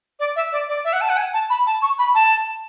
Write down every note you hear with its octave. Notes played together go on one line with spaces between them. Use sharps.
D5
E5
D5
D5
E5
F#5
A5
F#5
G#5
A5
B5
A5
C#6
B5
A5